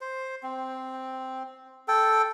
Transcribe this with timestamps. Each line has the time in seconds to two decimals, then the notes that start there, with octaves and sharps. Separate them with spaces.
0.01 C5
0.43 C4
1.88 A4 G5